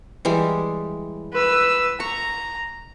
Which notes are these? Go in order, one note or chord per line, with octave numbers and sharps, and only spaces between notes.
E3 G3 G#3
B4 E6
A#5 C#6